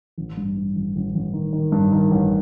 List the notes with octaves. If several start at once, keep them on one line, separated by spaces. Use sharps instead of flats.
A1
G2
G2
A1
A1
A1
D#3
D#3
G2
D#3
A1